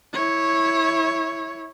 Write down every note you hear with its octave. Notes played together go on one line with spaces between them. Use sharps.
E4 C#5